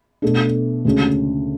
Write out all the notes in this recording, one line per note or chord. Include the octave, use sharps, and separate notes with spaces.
B2 A3 D4
D2 C#3 G#3 C#4